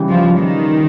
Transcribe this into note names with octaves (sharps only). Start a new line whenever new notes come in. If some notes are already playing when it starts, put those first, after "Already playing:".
Already playing: C#3 E3 G3
F3
D#3